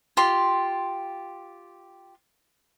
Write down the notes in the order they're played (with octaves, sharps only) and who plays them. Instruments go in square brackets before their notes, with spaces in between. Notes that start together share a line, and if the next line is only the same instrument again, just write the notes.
[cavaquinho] F4 G4 C6